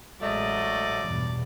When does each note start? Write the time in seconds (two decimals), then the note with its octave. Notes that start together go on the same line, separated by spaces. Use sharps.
0.21 A1 F#3 G#3 A3 D5 D#5
1.02 E2 G2 B2